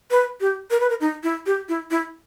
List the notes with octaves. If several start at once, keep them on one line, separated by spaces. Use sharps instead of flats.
B4
G4
A#4
B4
A#4
D#4
E4
G4
E4
E4